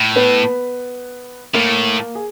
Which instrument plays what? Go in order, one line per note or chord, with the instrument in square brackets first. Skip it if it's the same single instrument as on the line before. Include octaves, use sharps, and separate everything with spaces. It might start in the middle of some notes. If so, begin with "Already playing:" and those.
Already playing: [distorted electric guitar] A2
[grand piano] B3 B4
[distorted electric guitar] A2 [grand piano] A#3 A#4
[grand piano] G#4